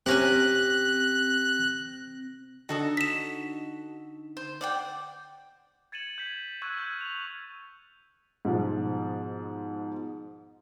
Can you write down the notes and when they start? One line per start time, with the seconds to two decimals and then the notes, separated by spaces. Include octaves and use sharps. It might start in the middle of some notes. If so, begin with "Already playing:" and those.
0.06 C3 C4 C#4 G4 G#5 F#6 A#6
2.69 D3 D#4 F#4 A4 D#5
2.97 B6 E7
4.37 C5
4.61 D5 F#5 G5
5.92 G#6 A6 C#7 D#7 E7 F#7
6.18 G6 G#6 B6
6.62 C#6 E6 F#6 G#6 B6 D#7
6.77 F6 G6 G#6 D#7
6.99 D#7 F7
8.45 G#2 B2 F3